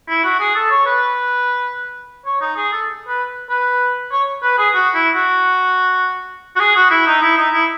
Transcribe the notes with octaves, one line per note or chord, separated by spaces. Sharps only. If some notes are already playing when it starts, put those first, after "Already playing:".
E4
F#4
G#4
A4
C#5
B4
C#5
D#4
G#4
A4
B4
B4
C#5
B4
G#4
F#4
E4
F#4
F#4
G#4
F#4
E4
D#4
E4
D#4
E4